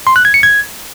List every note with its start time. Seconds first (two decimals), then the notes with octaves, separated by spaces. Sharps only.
0.07 C6
0.16 F#6
0.25 G#6
0.34 C#7
0.43 G#6